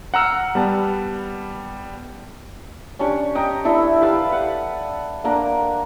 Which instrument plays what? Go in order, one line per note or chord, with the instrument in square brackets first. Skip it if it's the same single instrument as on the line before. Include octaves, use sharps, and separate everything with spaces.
[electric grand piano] F#5 A#5 E6 F6
G3 B3 A5
[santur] C#4 D4 G4 C#5
D#5 G5 A#5
D4 E4 A4 E5
G4 B4 F5 A5
F#5
A#3 D4 A#4 F#5